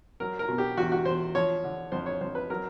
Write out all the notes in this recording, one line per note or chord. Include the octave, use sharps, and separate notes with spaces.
F#3 A#4
A#4
B2
G4
E2 F#4
F#4
E2 C5
F3 C#5
D3
F2 C5
C#5
F2 C5
B4
F#3 A#4